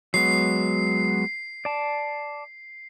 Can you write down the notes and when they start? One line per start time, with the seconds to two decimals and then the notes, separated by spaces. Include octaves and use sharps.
0.14 F#3 G#3 B3 C7
1.65 D5 A5